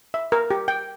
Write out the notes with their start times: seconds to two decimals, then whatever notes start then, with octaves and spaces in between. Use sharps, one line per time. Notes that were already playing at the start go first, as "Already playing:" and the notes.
0.14 E5
0.32 A#4
0.50 G4
0.68 G5